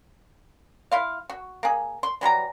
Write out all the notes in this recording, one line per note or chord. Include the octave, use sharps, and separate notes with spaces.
E4 F4 F5
F#4
A#3 G#4
C6
E3 F#3 G3 A#5